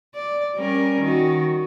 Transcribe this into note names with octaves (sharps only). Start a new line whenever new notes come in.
D5
G3 C#4 A#4
D#3 F#4